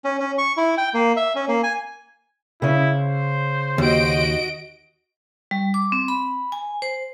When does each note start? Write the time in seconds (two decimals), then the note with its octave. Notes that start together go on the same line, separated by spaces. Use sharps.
0.04 C#4
0.20 C#4
0.38 C#6
0.57 E4
0.78 G5
0.94 A#3
1.16 E5
1.35 C#4
1.48 A#3
1.63 G#5
2.62 C#3 C#4 E4
2.96 C5
3.78 D#2 F#4 D#5 D7
5.51 G3
5.74 D6
5.92 C4
6.08 B5
6.52 G#5
6.82 C5